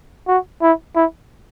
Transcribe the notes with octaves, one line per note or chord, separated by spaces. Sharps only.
F#4
E4
E4